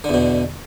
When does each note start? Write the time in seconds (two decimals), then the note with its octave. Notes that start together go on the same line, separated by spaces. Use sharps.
0.04 D3
0.09 E2
0.14 B2